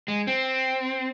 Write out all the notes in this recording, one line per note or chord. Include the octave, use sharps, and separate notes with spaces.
G#3
C4